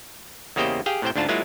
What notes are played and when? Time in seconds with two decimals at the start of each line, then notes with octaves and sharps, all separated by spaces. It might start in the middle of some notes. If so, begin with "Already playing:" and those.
0.56 E2 C#3 A#3 G4 C5 D#5
0.86 G4 G#4 F5 G5
1.02 A2 C3 C5 G5
1.16 D2 G#2 D4 F4 A5
1.28 F#3 G#3 A#3 E4 F4